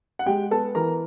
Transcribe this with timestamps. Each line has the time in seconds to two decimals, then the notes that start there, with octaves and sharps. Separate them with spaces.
0.19 F#5
0.26 G#3 G4 G5
0.51 B3 A4 A5
0.75 E3 A#4 A#5